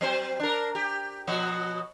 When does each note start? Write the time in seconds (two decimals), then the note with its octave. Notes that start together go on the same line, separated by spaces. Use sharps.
0.01 F#3 C4 C5
0.40 D4 A#4
0.75 G4
1.27 B2 F3 F#4